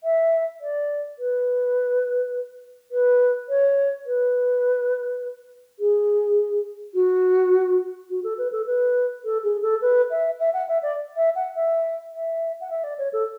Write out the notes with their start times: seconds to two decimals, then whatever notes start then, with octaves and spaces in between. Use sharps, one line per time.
0.03 E5
0.60 D5
1.18 B4
2.91 B4
3.48 C#5
4.06 B4
5.79 G#4
6.94 F#4
8.09 F#4
8.23 A4
8.37 B4
8.51 A4
8.66 B4
9.24 A4
9.43 G#4
9.62 A4
9.81 B4
10.10 E5
10.39 E5
10.53 F#5
10.67 E5
10.82 D5
11.16 E5
11.35 F#5
11.55 E5
12.11 E5
12.60 F#5
12.70 E5
12.83 D5
12.98 C#5
13.12 A4